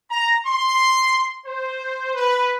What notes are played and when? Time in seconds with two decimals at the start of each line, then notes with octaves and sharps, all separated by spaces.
0.11 A#5
0.46 C6
1.46 C5
2.15 B4